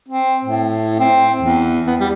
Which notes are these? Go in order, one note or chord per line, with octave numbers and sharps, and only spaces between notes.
C4
A2
C4
E2
B3
G3